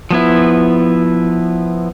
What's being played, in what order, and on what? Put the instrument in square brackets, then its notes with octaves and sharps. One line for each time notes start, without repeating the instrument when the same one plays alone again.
[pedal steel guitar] F3 B3 E4